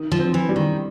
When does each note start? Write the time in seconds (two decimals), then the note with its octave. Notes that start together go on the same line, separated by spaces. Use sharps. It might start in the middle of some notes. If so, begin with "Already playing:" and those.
Already playing: D#3
0.12 F3
0.19 C4
0.34 E3
0.49 G3
0.56 D#3